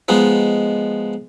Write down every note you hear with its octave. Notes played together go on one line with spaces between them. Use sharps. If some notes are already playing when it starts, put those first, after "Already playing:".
F3 G#3 B3 D#4